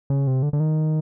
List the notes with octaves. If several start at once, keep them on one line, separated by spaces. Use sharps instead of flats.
C#3
C3
D3
D3
D#3